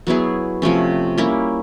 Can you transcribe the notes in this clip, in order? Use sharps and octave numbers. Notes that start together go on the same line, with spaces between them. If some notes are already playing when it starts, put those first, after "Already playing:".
F#3 B3 E4 G#4
C3 F3 A3 C#4
G3 A#3 C#4 E4